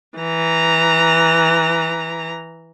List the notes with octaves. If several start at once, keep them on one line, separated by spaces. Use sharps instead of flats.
E3 A#5